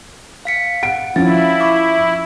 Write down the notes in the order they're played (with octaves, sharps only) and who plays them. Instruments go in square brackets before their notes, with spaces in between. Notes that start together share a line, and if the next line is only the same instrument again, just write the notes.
[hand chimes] F5 B6 C#7
[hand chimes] F#5 [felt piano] D7
[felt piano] F3 C#4 [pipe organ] E4 [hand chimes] F5 A6
[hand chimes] C#6 D6 E6